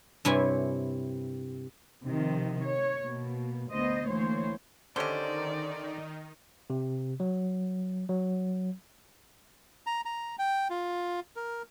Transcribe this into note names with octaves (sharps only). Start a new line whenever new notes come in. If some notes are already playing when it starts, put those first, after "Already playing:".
G2 C3 E4 C#5 G#5
C3 D#3 F3
C#5
B2 A#3
D2 B3 C5 D#5
D2 E3 A#3 C5 C#5
D3 D#3 C#4 D#4 G4 C5 D5 D#5
C3
F#3
F#3
A#5
A#5
G5
F4
A#4